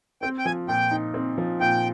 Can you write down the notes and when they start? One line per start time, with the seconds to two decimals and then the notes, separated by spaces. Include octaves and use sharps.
0.22 C4 G5
0.39 G5
0.45 F3 G#5
0.68 A#2 G5
0.91 D#4
1.14 C4
1.38 F3
1.61 A#2 G5